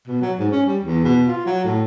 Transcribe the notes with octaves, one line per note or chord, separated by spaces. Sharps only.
B2
F#3
G#2
C#4
G3
E2
B2
F4
F#3
A2